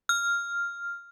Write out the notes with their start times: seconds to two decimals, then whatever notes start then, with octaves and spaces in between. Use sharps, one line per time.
0.09 F6